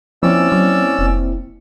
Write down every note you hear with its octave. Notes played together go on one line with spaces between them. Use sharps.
F3 A#3 C4 C#4 E4 D5 E6
F#3
F1